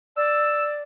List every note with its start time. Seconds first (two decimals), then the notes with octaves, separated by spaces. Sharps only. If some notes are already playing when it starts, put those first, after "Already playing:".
0.16 D5 E6